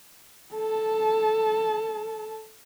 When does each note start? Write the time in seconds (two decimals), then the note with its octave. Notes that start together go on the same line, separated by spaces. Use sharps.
0.53 A4 A5